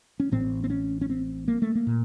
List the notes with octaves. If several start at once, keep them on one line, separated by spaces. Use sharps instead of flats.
C#4
A1 A2 C4
C4
C#4
C#4
C4
A#3
A3
A#3
A#2